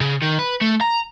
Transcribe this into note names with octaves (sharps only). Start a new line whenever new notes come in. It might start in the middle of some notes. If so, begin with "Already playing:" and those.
C#3
D#3
B4
A3
A#5